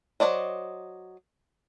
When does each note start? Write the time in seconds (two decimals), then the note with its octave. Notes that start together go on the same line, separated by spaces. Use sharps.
0.20 F#3 E4 C5 D5 D#5